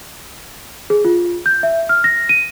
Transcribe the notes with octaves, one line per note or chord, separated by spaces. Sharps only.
G#4
F4
G6
E5
F6
A#6
D#7